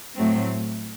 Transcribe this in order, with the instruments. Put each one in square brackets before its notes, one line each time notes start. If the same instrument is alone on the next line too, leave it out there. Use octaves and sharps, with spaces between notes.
[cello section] A2 F#3 A3 C4